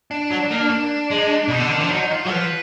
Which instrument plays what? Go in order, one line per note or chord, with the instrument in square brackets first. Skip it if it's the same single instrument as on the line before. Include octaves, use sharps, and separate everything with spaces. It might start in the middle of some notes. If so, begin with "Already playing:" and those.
[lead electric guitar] D4
[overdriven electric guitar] F#3
A#3
[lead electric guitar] D4
[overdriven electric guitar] G#3
[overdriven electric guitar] B2 [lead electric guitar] D#4
[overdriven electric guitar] D3 [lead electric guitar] D4
[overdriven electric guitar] D#3 [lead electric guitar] D4
[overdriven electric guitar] F3 [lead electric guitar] D4
[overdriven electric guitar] F#3 [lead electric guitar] D#4
[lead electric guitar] D#4
F4
[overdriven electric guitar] F#3
[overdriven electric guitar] F3 [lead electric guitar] B4